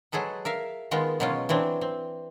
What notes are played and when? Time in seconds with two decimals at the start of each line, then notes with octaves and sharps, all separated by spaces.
0.12 F#3 G#3 G#4 A4 B4
0.45 A#4 E5 F5
0.91 D#3 G#3 B3 F4
1.20 B2 F#3 G#3 C#4 F4
1.49 E3 F#3 C4 D4
1.81 C4